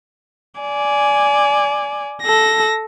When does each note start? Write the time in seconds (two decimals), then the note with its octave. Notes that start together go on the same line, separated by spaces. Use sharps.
0.61 D5 G#5
2.22 A4 A#6